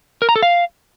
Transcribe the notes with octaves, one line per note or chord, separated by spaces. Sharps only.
A#4
A#5
A4
F5